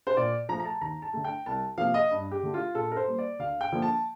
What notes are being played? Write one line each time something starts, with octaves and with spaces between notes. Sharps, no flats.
C5
A#2 D5
F3 A3 A#5
A#5
A5
D#2 A#5
A5
D3 A3
G5
C2 A5
C3 F3 A#3 F5
D#5
G2
G4
D3 A3
F4
A#2 A4
A#4
C5
G3 A#3
D5
D2 F5
G5
D3 F3 A#3
A5